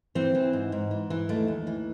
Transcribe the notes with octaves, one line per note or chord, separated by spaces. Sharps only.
E3 C4
E3
G#2
G#2
E3
E3
D#2 A3
D#2
E3